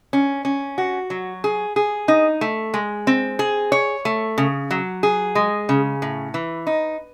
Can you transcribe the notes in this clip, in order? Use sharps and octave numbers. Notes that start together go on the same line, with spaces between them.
C#4
C#4
F#4
F#3
G#4
G#4
D#4
A3
G#3
C4
G#4
C#5
A3
C#3
F#3
G#4
G#3
C#3
A2
E3
D#4